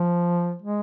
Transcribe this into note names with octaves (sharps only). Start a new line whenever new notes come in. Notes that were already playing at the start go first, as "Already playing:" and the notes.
Already playing: F3
G#3